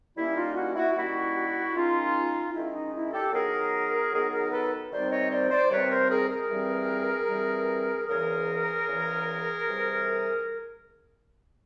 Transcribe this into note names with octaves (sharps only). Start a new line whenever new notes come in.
D#3 G3 A#3 C#4 E4
D#4 F4
E4 F#4
E4 F#4
D#3 G3 A#3 C#4 E4 F#4
D#3 G#3 C#4 D#4 F4
D#3 G#3 C#4 E4
D#4
E4
G4 A4
D#3 F#3 B3 D#4 G#4 A#4
D#3 F#3 B3 D#4 G#4 A#4
G#4 A#4
A4 B4
C3 D#3 G3 C4 D#4 C5 D5
C#5 D#5
C5 D5
C5 D5
C3 D#3 G3 C4 D#4 B4 C#5
A#4 C5
G#4 A#4
G#4 A#4
G2 E3 G3 C4
G2 E3 G3 C4
E2 C#3 E3 G#4 A#4
E2 C#3 E3
C3 E3 G3